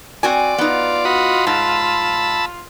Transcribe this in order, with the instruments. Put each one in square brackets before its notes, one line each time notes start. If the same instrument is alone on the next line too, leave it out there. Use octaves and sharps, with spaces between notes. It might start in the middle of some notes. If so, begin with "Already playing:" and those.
[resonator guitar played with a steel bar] C4 F#4 G#5 [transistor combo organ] D5
[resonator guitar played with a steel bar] B3 D#4 [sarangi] F4
[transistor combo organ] F#4 D#5 B5
[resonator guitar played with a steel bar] G#2 [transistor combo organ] A5 B5 E6